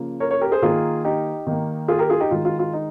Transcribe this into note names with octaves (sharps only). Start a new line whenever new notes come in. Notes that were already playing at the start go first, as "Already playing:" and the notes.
Already playing: C#3 F3 A#3
A#4 C#5
A#4 C#5
G4 A#4
G#4 C5
D#3 A#3 F4 G#4
D#4 G4
D#3 A#3
F4 G#4
G4 A#4
F4 G#4
D#4 G4
D#3 G#3 F4
F4
F4
D#4